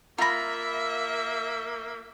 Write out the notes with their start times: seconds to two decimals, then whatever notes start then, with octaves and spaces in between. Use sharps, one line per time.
0.18 A#3 F4 E5 A#5 B5 A#6